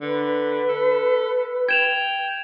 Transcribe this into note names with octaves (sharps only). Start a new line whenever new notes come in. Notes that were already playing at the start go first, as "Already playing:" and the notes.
D3 B4
A4
G5 G#6 E7 F7